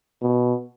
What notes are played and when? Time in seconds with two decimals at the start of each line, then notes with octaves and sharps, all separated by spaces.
0.22 B2